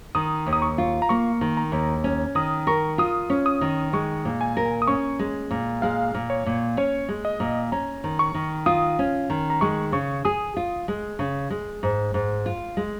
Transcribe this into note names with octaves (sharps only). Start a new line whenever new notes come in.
D#3 D#6
D#2
D#6
C#6
F4
A#5
A#3 C#6
D#3
A#5
D#2
C#4
D#3 D#6
A#4 C#6
F4 D#6
C#4
D#6
D#3
G#3 C#6
A#2
G#5
A#4
D#6
C#4 C#6
G#3
A#2
G#3 F5
A#2
C#5
A#2
C#4 C#5
G#3
D#5
A#2
C#4 A#5
D#3
C#6
D#3
F4 D#6
C#4
D#3
A#5
G#3 C#6
C#3 C#6
G#4 D#6
F4
G#3
C#3
G#3
G#2
G#2
F4
G#3